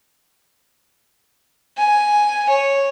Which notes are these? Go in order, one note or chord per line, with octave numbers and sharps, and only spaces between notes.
G#5
C#5